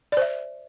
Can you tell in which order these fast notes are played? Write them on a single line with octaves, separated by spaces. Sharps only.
D5 C5 E5